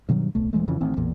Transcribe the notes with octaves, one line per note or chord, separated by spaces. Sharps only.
G2 B2 D#3 F#3
D1 B1 A3
D#1 E3 G#3 A3
F2 C#3 E3 F3
A1 D#3 C4
A1 E2 A#2